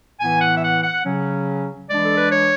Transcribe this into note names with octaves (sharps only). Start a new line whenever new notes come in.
A2 E3 B3 G#5
F#5
E5
F#5
F#5
C#3 F#3 C#4
E3 G#3 D4 D5
A4
B4
C#5